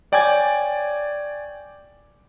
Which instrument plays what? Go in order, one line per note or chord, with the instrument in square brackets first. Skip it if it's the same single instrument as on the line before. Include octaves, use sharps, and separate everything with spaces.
[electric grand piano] C#5 D5 G5 G#5 D6 G#6